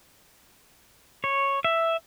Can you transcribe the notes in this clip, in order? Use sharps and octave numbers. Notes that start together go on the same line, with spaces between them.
C#5
E5